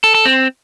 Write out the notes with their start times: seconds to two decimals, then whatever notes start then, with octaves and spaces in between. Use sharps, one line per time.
0.04 A4
0.15 A4
0.25 C4